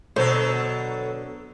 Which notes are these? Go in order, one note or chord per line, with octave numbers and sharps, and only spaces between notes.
B2 D3 F#3 A4 C5